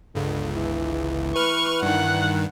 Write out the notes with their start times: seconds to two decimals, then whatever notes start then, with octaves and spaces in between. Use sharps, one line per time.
0.15 G1 C#2 D3
0.56 E3
1.36 B4 C#6 F6
1.82 G2 D#3 F#5